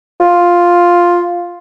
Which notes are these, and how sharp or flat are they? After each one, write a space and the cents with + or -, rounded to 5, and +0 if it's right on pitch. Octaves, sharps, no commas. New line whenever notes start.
F4 +5